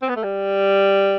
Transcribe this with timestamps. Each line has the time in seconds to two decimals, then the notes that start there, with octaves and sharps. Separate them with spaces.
0.02 C4
0.09 B3
0.16 A3
0.24 G3